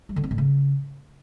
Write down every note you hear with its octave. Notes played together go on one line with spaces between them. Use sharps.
G3
D3
C4
A2
C#3